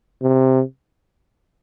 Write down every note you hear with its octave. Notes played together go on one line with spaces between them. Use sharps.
C3